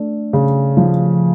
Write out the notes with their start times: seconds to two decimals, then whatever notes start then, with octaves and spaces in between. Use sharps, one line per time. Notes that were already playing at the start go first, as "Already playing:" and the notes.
Already playing: A3 D4
0.33 C#3
0.77 F3